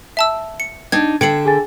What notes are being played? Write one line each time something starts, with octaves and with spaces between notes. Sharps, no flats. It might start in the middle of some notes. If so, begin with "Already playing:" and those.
E5 A5 E6
C#7
D4 D#4 G5 G#6
D3 E5 G5 G#6 C7 C#7 F#7
G#4 G#5 A6